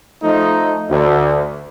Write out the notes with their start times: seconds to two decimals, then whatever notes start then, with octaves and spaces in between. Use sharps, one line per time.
0.22 F3 A3 D#4
0.90 D2